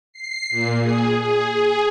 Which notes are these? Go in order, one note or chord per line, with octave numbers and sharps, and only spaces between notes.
C7
A#2
G#4
G#4
G#4